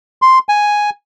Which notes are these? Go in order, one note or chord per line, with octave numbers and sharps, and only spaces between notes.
C6
G#5